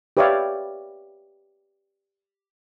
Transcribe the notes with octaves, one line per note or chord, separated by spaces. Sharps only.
G4 B4 C#5 D5 E5 F5